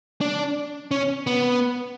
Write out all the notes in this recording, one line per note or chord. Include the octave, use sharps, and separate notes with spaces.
D4
C#4
B3